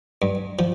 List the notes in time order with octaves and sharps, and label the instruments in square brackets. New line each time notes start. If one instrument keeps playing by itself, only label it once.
[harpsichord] G2
F3